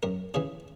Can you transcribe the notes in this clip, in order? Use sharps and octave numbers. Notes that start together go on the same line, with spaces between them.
F#2 A#4
C#3 E3 G#4